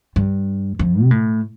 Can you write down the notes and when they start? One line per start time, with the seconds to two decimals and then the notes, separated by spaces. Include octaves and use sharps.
0.16 G2
0.79 F2
1.02 C3
1.11 A2